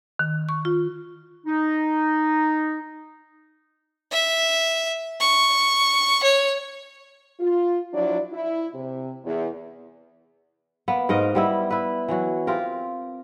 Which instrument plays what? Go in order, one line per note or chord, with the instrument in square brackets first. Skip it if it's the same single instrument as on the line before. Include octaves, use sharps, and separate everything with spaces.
[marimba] D#3
C#6
F4
[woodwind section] D#4
[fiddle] E5
C#6
C#5
[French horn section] F4
F3 F#3 D4 E4 D5
E4
C3
E2
[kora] A#3 B3
G#2 A#4 D#5 F5
G3 B3 E4
E4 B4
E3 F#3 F#4
C4 F4 G4 A#4